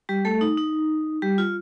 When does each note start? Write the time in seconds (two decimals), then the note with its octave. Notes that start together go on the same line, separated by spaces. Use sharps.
0.09 G3 G4
0.25 A3 A4
0.41 D#4
0.57 D#4
1.22 G3 G4
1.38 F4